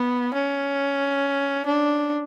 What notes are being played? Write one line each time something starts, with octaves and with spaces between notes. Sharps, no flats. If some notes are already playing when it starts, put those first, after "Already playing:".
Already playing: B3
C#4
D4